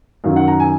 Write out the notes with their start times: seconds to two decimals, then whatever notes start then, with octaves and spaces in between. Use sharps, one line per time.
0.24 F#2 D#3 F#3 F5
0.36 F#5
0.48 A#5
0.60 G#5